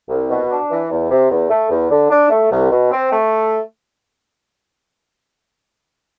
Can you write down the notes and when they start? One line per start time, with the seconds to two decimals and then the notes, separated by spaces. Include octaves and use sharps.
0.09 C2
0.29 B2
0.50 D4
0.70 E3
0.90 E2
1.10 C3
1.31 E2
1.50 A3
1.70 E2
1.91 D3
2.10 D4
2.30 A3
2.51 C2
2.71 B2
2.91 C4
3.11 A3